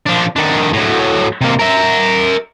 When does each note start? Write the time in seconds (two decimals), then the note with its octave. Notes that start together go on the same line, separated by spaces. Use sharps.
0.06 F3 D4
0.36 D#3 D4
0.73 A2 F#3
1.41 C3 A#3
1.59 A#4 E5